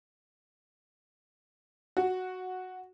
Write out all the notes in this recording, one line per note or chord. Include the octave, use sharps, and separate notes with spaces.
F#4